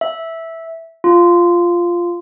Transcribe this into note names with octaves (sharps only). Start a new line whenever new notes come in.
E5
F4